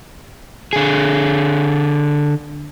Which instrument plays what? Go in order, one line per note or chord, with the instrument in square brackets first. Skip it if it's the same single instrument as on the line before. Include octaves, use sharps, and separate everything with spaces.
[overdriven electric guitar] D3 G#4